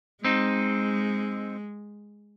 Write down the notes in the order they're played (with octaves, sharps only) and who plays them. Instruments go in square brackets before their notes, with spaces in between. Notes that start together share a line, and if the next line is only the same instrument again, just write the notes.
[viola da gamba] G#3 [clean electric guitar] C4 D#4